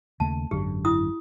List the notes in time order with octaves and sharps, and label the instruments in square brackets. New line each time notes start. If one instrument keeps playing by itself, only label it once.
[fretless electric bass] D#2 C#3 A3 [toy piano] A5
[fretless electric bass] G#1 F#2 D3 [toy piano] G4
[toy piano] E4 D#6